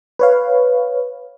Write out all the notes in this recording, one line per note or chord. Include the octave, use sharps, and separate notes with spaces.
B4 C#5 F5